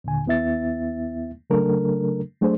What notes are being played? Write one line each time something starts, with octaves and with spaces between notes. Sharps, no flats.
D#2 A#2 D3 G#5
D#2 B3 E4 E5 A6
C#3 F#3 A3 D4 A4 A#4
F#3 A3 D4 G#4 C5